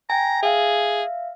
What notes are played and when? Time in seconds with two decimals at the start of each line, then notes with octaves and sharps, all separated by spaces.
0.10 G5 G#5 A#5
0.43 G#4 E5 F5